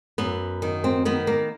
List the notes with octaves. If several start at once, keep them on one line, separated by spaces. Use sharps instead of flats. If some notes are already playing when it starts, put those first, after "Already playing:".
F#2 B3
D#3
C4
D#3 B3
A#3